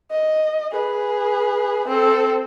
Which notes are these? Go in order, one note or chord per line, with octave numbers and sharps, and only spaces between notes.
D#5
G#4 B4
C4 A4